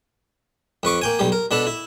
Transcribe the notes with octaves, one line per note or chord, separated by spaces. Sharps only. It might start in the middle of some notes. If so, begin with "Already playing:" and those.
F2 B4 C#6 D6
A#3 G5 G#5
B1 G3 G4
A#4
B2 D4 A4 B5
E4